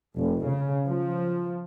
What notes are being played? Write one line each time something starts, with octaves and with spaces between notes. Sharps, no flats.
F1
C#3
F3